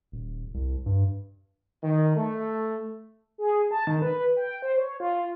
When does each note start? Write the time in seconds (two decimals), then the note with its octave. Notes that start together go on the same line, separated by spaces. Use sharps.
0.12 D#1
0.54 C2
0.86 G2
1.82 D#3
2.16 A3
3.38 G#4
3.71 A5
3.87 D#3
4.02 B4
4.37 G5
4.62 C5
4.77 C#5
5.00 F4